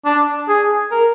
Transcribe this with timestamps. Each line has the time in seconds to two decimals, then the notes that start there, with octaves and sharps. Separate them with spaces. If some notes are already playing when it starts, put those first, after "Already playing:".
0.05 D4
0.48 G#4
0.91 A#4